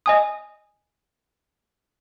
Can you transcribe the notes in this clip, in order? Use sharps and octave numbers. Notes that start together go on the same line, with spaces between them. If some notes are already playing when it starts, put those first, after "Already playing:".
D#5 G#5 D#6